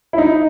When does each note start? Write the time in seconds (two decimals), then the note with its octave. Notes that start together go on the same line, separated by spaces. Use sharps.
0.13 E4
0.18 D#4